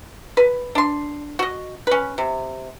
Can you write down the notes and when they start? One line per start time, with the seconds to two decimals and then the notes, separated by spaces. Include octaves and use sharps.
0.37 B4
0.75 D4 C6
1.39 F#4 D#5
1.87 C#4 B4
2.18 C3